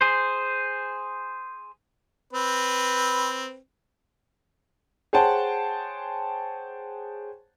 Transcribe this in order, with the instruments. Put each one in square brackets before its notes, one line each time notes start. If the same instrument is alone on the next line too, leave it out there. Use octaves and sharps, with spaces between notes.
[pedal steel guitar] G#4 C5
[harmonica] C4 B4
[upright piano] G#4 C5 C#5 F#5 G5 A5